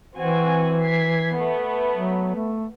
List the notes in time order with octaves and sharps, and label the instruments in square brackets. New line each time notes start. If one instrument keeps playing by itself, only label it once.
[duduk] E3 [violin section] C4 F#4 G#5
[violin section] G#6 B6 C7
A3 B3
[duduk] F#3
A3